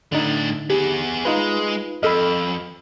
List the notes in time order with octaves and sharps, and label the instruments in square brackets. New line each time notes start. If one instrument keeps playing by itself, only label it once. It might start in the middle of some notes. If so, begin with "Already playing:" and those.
[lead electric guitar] A2 D4 [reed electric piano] D3 D#4
[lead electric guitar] B3 G#4 [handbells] G4
[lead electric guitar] G#3 [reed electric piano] D#4 F4 B4
[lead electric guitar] F2 [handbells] A4 D#5 [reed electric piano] B5 E6 F6